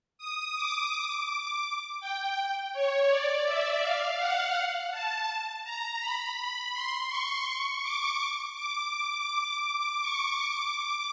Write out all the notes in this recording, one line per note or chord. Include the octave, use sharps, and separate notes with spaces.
D#6
D6
D6
G5
C#5
D5
E5
F5
F#5
A5
A#5
B5
B5
C6
C#6
C#6
D6
D6
D6
D6
D6
C#6
D6